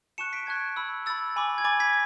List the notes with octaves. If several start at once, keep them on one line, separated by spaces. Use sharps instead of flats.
A5 C#6 F#6 C#7 E7
B6 D7
A5 C#6 F#6 G#6
B5 E6
B5 E6 A6
G#5 B5 D6
G#6
G#5 B5 D6 A6
G#6 B6